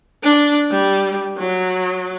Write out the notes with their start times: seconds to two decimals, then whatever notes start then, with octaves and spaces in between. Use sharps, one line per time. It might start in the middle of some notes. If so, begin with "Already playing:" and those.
0.23 D4
0.71 G3
1.37 F#3